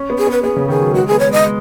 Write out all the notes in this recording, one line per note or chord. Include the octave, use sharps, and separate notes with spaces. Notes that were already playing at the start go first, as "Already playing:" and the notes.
Already playing: C#4
B3
G#4
B3 B4
B3 G#4
C#3
D#3 G#4
F#3
G#3 F#4
B3 G#4
C#5
G#3 D#5
G#3